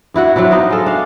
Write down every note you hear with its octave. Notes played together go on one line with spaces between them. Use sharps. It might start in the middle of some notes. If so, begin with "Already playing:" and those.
G2 E4 F#4 F#5
F#3 C4 D4 E4
B3 D#4 A#4 F5
G#3 A4 F5
D4 F5